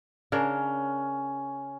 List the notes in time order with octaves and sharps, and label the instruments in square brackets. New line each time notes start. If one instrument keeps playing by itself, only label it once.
[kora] C#3 D4 A#4 [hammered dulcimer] C#4